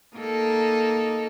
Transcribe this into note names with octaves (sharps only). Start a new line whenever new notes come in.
A#3 D#4 A4